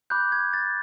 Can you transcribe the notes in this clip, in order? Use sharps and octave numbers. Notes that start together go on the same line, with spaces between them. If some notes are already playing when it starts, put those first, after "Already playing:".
B5 D6 F#6 G6
G#6
A6